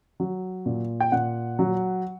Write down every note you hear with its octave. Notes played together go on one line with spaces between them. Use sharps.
F#3
A#2
G5
A#2 F#5
F#3